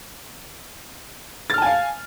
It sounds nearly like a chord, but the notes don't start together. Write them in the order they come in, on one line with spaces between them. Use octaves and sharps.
A6 F6 A5 G#5 F5